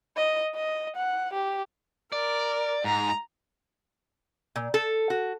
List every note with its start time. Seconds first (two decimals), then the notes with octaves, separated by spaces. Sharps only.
0.16 D#5
0.55 D#5
0.96 F#5
1.33 G4
2.12 A#4 D5
2.84 G#2 A#5
4.56 A#2
4.74 A4
5.10 F#4